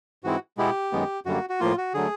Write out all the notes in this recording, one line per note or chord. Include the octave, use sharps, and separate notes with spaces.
G#2 E3 G#3 C4 E4 F#4
B2 G#3 B3 E4 G4
F#2 D#3 G#3 B3
F#2 D3 G3 A#3 F#4
F#4
A2 F3 A#3 F4
F#4
D3 F#3 A3 G#4